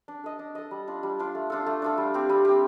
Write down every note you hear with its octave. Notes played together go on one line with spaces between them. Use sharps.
D4
A4 D#5
D4
A4 D#5
G3
D4 F4
G3
D4 F4
A3
D4 F4 A4
A3
D4 F4 A4
G3
C4 G4
G3
C4 G4